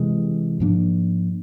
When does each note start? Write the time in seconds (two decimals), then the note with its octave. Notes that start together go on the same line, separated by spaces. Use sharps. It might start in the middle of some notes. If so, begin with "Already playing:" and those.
Already playing: C3 E3 G#3
0.60 G#2 F3 A#3 D4